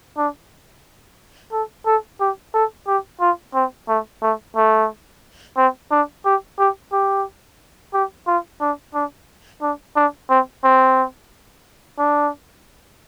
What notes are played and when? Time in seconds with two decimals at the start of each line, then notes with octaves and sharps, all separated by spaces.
0.17 D4
1.52 A4
1.86 A4
2.20 G4
2.54 A4
2.87 G4
3.21 F4
3.55 C4
3.88 A3
4.22 A3
4.56 A3
5.57 C4
5.91 D4
6.25 G4
6.58 G4
6.92 G4
7.93 G4
8.27 F4
8.61 D4
8.95 D4
9.62 D4
9.96 D4
10.30 C4
10.64 C4
11.98 D4